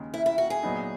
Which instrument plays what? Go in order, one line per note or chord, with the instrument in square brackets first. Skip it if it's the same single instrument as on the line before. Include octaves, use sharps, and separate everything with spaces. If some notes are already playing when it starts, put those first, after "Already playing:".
Already playing: [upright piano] D#2 C#3 G#3
[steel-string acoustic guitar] E4
E4
F#4
G#4
[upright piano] A#2 F#3 B3 D#4